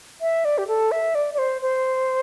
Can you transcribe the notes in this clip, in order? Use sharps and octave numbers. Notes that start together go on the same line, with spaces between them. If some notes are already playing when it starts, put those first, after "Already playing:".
E5
D5
G4
A4
E5
D5
D5
C5
C5